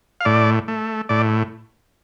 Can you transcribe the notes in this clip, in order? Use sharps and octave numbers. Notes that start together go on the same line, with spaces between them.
F5
A2 D5
A3
A2 D5